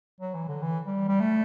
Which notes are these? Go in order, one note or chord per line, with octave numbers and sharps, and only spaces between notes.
F#3
E3
D3
E3
G3
G3
A3